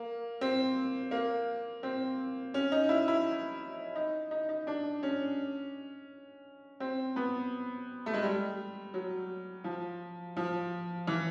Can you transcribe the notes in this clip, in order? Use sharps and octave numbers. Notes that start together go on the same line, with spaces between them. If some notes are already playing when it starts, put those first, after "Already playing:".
Already playing: A#3
C4
A#3
C4
C#4
D#4
E4
E4
D#4
D#4
D#4
D4
C#4
C4
B3
A3
G#3
G3
F#3
F3
F3
E3